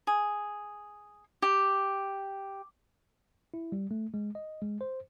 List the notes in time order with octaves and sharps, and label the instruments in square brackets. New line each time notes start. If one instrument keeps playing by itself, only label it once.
[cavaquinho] G#4
G4
[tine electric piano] E4
G3
A3
G#3
D#5
G#3
C5